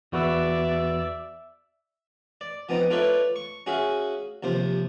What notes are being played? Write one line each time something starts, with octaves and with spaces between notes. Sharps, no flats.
E2 F#4 B4 D5 E5
D5
F3 B3 C4 D#4
F4 A4 B4 C#5 D5 E5
C#6
C#4 F#4 G#4 E5 F5
D#2 C3 F3 C5